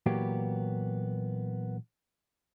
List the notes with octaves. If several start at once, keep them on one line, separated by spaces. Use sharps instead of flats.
A#2 E3 F#3 A#3 B3 G4